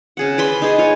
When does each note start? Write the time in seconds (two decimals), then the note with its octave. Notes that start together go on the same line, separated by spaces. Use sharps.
0.17 C#3 G#4 F#5
0.38 B4 D5 B5 C6
0.62 D#4 G#4 D#5
0.78 F4 C#5